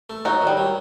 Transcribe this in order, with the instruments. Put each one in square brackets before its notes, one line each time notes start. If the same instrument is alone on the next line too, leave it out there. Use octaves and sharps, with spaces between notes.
[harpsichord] A3
[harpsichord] F#3 [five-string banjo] D#4 F#4
[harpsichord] D#3
[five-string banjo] G3
[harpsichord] F#3